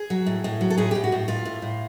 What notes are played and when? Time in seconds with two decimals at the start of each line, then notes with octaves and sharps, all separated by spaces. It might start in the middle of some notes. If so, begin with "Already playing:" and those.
Already playing: G#4
0.10 F#3
0.26 A2
0.44 A2
0.61 F#3
0.70 A4
0.78 A2 G#4
0.91 A2 G4
1.04 F#4
1.12 A2
1.28 A2 F4
1.45 A2
1.62 A2